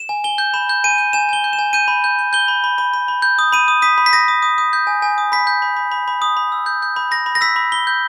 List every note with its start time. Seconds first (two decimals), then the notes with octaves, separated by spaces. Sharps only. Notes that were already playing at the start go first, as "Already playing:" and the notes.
Already playing: E7
0.09 G#5
0.24 G#5 G7
0.38 G6
0.54 B5 E7
0.69 G6
0.84 G#5 D#7
0.98 G6
1.13 G#5 E7
1.29 G#5 G7
1.44 G6
1.53 E7
1.59 G#5
1.73 G6 D#7
1.88 B5
2.04 G6
2.19 G6
2.33 G6 G7
2.48 B5
2.64 B5
2.78 B5
2.94 B5
3.08 B5
3.22 G6
3.39 D#6
3.52 B5 D#7
3.68 D#6
3.82 D#6 B6
3.98 B5
4.06 B6
4.13 D#6 A#6
4.28 D#6
4.42 D#6
4.58 D#6
4.73 G6
4.87 G#5
5.02 G#5
5.18 D#6
5.32 B5 B6
5.47 G6
5.62 B5
5.77 B5
5.92 B5
6.08 B5
6.22 D#6
6.37 B5
6.52 E6
6.66 G6
6.82 G6
6.96 B5
7.11 B5 A#6
7.26 B5
7.35 A#6
7.41 E6 B6
7.56 B5
7.72 B5 G7
7.87 G6